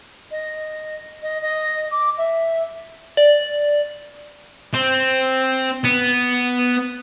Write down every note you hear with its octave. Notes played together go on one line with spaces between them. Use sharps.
D#5
D#5
D#5
D6
E5
D5
C4
B3